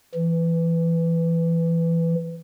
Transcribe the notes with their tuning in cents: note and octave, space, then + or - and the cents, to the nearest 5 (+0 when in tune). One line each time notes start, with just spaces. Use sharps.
E3 +15